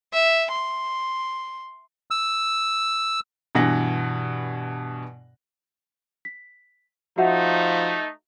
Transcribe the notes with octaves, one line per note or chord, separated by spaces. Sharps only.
E5
C6
E6
G2 B2 E3 F#5 A#6
B6
F3 A3 D#4 F#4 E5 F#5